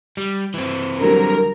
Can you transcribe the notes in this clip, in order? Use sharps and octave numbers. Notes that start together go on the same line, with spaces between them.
G3
E3 C4
D3 F#3 G3 A#4